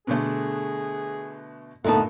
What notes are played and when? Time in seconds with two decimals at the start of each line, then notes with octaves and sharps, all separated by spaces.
0.07 B2 D3 A3 G#4
1.84 D2 G2 A#2 A3 B3 D#4 A5